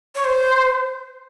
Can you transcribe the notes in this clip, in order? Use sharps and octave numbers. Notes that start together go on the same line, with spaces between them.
C#5
C5